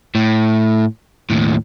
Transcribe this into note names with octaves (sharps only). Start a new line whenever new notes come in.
A2
D#2 A2